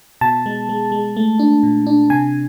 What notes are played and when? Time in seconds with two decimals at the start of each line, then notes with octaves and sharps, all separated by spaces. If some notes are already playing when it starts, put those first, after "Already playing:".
0.21 B2 A5
0.46 G#3
0.69 G#3
0.92 G#3
1.17 A3
1.39 D4
1.63 A#2
1.87 D4
2.10 C3 G#5